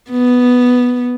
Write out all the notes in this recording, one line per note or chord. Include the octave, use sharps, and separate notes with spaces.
B3